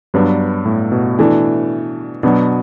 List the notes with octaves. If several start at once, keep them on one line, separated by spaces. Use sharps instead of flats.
G2 F#3 B3 D4
A2
B2
E3 A3 D4
B2 F#3 B3 D4